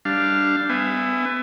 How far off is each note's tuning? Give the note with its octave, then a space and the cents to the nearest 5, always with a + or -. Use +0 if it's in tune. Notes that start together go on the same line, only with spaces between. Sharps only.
G3 +0 D4 +0 F5 -10
B3 +30 E5 +15 G#5 -15